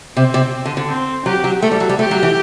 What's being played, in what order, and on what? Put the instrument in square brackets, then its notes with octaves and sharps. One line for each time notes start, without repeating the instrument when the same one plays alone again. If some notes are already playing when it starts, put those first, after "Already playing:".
[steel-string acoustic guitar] C3 [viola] C4
[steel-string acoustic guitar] C3
D3
D3
[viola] C4
[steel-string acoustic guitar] F#3 [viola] G4
[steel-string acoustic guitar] F#3
[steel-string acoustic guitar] A3 [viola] A4
[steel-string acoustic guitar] G3
F#3
G3
[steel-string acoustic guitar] A3 [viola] G4
[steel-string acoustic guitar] F#3
E3